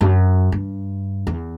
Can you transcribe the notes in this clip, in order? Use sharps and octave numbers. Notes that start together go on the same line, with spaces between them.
F#2
G2
E2